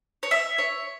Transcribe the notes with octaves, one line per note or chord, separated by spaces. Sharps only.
C#5
E5
C#5